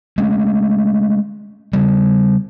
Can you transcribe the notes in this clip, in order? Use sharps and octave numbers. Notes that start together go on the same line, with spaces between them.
G#3 A3 C#4
C#3 G3